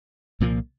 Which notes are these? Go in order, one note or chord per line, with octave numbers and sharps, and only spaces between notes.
C2 A#2 F3 A#3